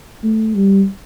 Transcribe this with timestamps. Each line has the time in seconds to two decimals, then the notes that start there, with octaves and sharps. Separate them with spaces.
0.24 A3
0.55 G3